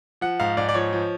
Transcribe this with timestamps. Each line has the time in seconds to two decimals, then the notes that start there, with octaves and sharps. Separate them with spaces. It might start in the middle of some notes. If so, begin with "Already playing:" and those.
0.21 F3 F#5
0.40 G#2 F5
0.57 G#2 D5
0.69 D5
0.74 F3 C#5
0.93 F3